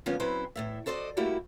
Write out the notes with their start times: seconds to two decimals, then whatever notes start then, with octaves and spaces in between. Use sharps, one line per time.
0.06 D3 F3 G#3 A#3 B3 C#4
0.20 F#3 C4 C#4 E4 B4 C5
0.56 E2 A2 E5
0.86 F#4 A4 C5 D5 D#5
1.17 G3 A3 A#3 E4 F#4 G4